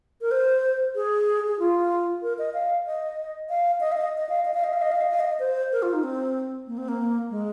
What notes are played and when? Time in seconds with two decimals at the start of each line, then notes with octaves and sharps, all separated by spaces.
0.21 A#4
0.31 C5
0.95 G#4
1.47 G#4
1.59 F4
2.22 A#4
2.39 D#5
2.54 F5
2.86 D#5
3.49 F5
3.80 D#5
3.92 F5
3.97 D#5
4.18 D#5
4.29 F5
4.45 D#5
4.54 F5
4.64 D#5
4.73 F5
4.82 D#5
4.91 F5
5.01 D#5
5.10 F5
5.20 D#5
5.39 C5
5.72 A#4
5.82 F4
5.93 D#4
6.03 C4
6.67 A#3
6.78 C4
6.88 A#3
7.30 G#3